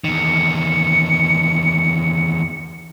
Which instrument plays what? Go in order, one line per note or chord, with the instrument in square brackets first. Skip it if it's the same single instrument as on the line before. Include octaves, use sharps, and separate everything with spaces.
[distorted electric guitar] E2 D#3 [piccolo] C#7